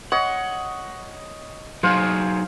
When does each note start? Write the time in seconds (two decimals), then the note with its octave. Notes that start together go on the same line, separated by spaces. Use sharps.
0.12 C#5 D#5 F#5
1.83 F#3 D#4 G#4 C5 F5